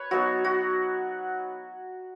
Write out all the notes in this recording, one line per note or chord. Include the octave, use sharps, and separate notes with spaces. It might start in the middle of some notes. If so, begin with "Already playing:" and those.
Already playing: B4 C#5
F#3 B3 D#4 F#4
F#4